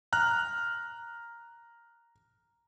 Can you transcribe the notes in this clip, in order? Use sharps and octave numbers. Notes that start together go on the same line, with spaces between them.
A#5 F6 F#6